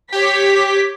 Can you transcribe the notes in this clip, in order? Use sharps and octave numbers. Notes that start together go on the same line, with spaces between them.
G4 C#5 B6